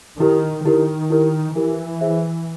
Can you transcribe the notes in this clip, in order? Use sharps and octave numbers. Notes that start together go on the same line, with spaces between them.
D#3 E4 G4 A#4
D#3 E4 G4 A#4
E4 G4 A#4
E3 E4 G4 A#4
G#4 C5 E5